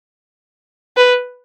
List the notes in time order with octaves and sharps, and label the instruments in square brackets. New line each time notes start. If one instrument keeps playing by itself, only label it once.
[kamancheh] B4